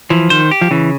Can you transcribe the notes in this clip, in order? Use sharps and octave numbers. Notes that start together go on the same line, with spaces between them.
E3 F3
D#3 C5
G4
F3
C#3 E3